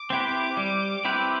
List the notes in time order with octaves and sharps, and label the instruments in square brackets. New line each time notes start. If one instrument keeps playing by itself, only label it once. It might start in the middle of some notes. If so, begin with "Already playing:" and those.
Already playing: [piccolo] D6
[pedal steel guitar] C4 E4 G4 B4
G3
C4 E4 G4 B4